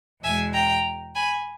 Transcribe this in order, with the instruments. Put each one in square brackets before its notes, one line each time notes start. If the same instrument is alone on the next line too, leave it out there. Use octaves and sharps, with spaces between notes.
[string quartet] E2 B2 G#3 E5 G#5
G5 A#5
G#5 B5